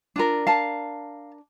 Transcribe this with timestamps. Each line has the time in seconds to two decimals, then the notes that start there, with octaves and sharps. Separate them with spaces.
0.16 D4 F4 A#4
0.47 F5 A5